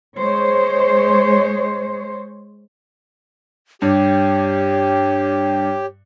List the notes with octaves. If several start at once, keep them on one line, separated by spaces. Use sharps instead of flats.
G#3 C5 C#5
G2 G4 C#5